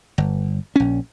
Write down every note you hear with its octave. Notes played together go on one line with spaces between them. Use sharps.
G1
A#1 C#4